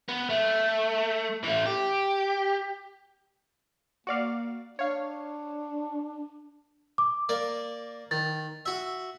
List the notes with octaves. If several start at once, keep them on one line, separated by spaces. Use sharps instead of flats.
B3
A3
E3 A3
G4
A#3 F#4 D5 F5
D4 C#5 F5
D6
A#3 D5
D#3 A6
F#4 E5